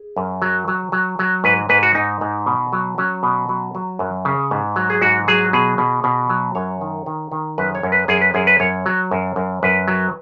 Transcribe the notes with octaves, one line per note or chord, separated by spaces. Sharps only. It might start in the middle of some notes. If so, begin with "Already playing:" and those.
Already playing: G#4
F#2
F#3
F#3
F#3
F#3
G#2 B4
G#2 B4
F#4
G#2 D#4
G#2
B2
F#3
F#3 C#4
B2
F#3
F#3
F#2
C#3
G#2
F#3
G#4
G#2 F#4
F#3 G#4
B2 G#4
B2
B2
F#3
F#2 C#5
D#3
D#3
D#3
F#2 B4
C#5
F#2
B4
F#2 G#4
B4
F#2 G#4
B4
F#2 C#5
F#3
F#2
F#2
F#2 B4
F#3